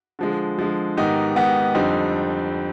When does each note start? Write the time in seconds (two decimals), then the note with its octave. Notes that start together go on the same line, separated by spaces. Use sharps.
0.19 D3 F3 G#3
0.58 D3 F3 G#3
0.97 G#2 D#3 B3 D#4 G4
1.36 G#2 D#3 B3 D#4 G4
1.74 F2 D3 G3 C4 D#4